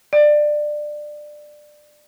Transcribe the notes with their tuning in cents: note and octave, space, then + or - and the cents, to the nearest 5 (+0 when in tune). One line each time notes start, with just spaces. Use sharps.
D5 +20